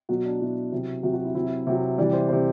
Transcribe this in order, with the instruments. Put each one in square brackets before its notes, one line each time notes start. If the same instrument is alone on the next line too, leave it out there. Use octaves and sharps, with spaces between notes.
[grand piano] B2 F#3 F#4
D4
B2 F#3 E4
C3 F#3
C3 F#3 F#4
F#4
E4
C3 F#3 E4
C3 F#3
C3 E3 G3 D5
C5
C3 E3 G3 C5